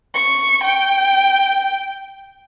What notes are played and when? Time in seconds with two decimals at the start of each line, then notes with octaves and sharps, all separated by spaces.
0.15 C#6
0.64 G5